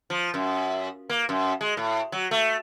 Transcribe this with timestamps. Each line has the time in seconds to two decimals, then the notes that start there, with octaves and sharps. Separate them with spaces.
0.10 F3
0.34 F#2
1.09 A#3
1.29 F#2
1.61 G#3
1.77 A2
2.12 F#3
2.31 A3